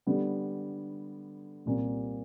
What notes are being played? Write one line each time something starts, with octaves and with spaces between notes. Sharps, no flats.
D3 G3 B3
C2 A#2 G3 C4